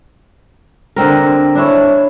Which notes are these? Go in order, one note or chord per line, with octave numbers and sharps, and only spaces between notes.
D3 C4 A#4
D4 E4 C#5